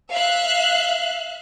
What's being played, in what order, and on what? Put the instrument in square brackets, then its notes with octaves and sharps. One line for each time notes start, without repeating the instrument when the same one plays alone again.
[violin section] E5 F5 F#6